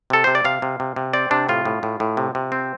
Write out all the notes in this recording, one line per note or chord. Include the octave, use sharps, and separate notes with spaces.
C3 A4
C3 C5
D5
C3 F5
C3
C3
C3
C4 D5
C3 D4
A2 F4
A2
A2
A2
C3
C3
C4